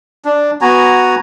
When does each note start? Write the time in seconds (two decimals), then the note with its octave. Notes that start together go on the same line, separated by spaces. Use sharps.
0.25 D4
0.61 B3 F#4 G#5 A#5